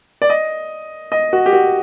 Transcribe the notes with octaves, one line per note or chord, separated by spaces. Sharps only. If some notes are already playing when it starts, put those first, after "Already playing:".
D5
D#5
D#5
F#4
G4
F#4